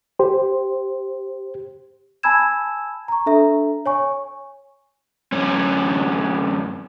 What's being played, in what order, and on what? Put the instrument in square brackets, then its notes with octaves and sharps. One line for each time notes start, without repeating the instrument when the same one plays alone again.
[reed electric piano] G4 C5
[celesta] G#5 A5 B5 E6 G#6 E7
A#5 C#6
D4 A4 E5 A#5
C#5 G#5 C#6
[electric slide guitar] F#2 A2 C#4